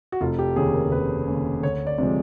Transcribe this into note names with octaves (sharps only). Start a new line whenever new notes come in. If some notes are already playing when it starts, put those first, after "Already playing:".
F#4
F1 F4
G4
D#2 C#3 G#4
A#4
F1 B4
D#2 C#3
D2 C#5
D5
C3 F3 G#3